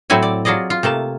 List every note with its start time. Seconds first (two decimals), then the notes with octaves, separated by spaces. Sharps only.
0.10 A2 F#3 C4 E4 G#5
0.23 D5
0.45 F#3 F4 G#4 D5 D#5
0.70 F4
0.83 C3 A3 A#3 A5